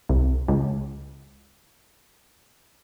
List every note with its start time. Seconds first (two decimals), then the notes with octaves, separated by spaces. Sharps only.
0.09 C2
0.48 C#2